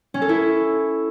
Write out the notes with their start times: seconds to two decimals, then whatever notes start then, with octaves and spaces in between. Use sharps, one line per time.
0.14 C#4
0.22 A4
0.29 E4